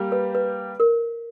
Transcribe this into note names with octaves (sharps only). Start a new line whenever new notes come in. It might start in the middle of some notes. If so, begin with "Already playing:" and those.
Already playing: G3 A#3 G4
B4
B4
A#4